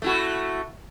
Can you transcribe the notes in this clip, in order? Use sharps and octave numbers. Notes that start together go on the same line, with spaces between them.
A3 E4 F#4